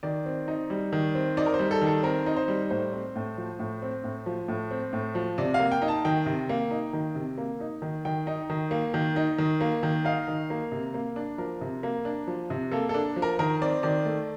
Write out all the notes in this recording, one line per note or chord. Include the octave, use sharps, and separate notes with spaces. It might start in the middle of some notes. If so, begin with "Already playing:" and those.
D#3 D5
C4
D#4
G3
D#3
C4
D#4 D5
A#4
C5
G3
A4
D#3
A4
C4 A#4
D#4
C5
G3
A2 C5
C4
A2
F3
A2
C4
A2
F3
A2
C4
A2
F3
C3 D5
F5
A#3
G5
D#4
A5
D#3 G5
C3
A#3
D#4
D#3
C3
A#3
D#4
D#3
D#3 G5
D#4
D#3
A#3
D#3
D#4
D#3
A#3
D#3
D#4 F5
D#3
A#3
C3
A#3
D4
F3 A#4
C3
A#3
D4
F3
C3
A#3 A4
A4
D4
F3
A#4
D#3 A#4
C4 D5
D#3 D5
A3